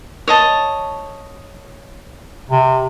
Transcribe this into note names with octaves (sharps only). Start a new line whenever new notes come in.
C#5 D#5 A5
C3